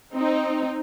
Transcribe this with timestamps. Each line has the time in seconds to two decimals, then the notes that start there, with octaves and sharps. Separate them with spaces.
0.14 C4 D#4